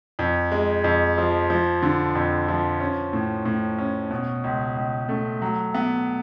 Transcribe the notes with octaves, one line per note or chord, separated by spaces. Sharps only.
F2
G#3
F2
F3
F3
D3
F2
F3
C#4
A2
A2
C#4
B2
C#2
C#2
A3
F#3
B3